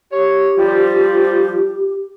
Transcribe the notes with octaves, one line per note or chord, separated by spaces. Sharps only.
G4 C#5
F3 G3 F4